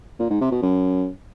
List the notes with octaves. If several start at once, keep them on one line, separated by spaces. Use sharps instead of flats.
A#2
G#2
C3
B2
F#2